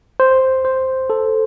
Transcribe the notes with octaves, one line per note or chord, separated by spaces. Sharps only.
C5
C5
A4